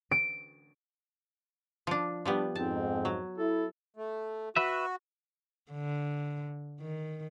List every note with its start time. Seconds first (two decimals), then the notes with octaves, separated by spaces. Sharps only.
0.11 D7
1.87 F3 D4
2.25 F3 G3 B3 D4
2.55 F2 G#2 C4 A5
3.05 F#3
3.38 E4 A4
3.97 A3
4.56 F#4 B4 E5
5.72 D3
6.81 D#3